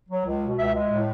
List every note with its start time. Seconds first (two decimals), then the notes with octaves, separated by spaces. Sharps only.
0.09 F#3
0.25 C#2
0.42 B2
0.57 C#2 E5
0.74 G#3
0.90 A2